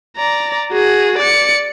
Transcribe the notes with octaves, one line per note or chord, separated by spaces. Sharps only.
D5 A#5
F#4 G#4
D5 C#7